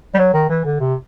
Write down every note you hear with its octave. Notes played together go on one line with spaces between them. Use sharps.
G3
F#3
D#3
E3
D3
C3